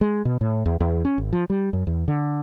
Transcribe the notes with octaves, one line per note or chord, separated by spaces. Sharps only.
G#3
B2
A2
E2
E2
C#4
G#1
F3
G3
F#2
E2
D3